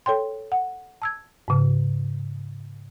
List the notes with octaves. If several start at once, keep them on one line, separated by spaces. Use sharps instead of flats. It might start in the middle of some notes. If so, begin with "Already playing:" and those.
A4 C#5 G5 C6
F#5
A5 E6 G#6
G#2 C#3